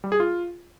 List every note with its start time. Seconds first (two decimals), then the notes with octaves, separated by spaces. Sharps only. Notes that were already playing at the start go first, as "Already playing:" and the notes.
0.04 G3
0.12 G#4
0.20 F4